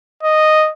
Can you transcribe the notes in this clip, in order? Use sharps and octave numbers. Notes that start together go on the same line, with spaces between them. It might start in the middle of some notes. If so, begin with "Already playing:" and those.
D#5